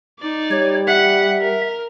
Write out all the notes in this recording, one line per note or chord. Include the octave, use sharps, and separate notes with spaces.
D#4 D5
G3 C#5
E5 F#5
A#4